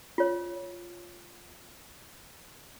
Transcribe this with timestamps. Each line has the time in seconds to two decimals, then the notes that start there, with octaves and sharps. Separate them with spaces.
0.18 F4 C#5